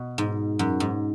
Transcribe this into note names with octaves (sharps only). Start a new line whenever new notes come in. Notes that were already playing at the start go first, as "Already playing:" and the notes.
Already playing: B2
G#2
F#2
G#2